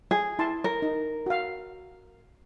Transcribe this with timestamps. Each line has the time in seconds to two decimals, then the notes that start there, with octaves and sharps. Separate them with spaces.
0.11 G#4
0.39 E4 A5 C6
0.64 A#4
0.82 D#4
1.26 F#4 F5